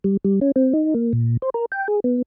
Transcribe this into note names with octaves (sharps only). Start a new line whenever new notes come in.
G3
G3
C#4
C4
D#4
A#3
A#2
C5
A#4
G5
G#4
B3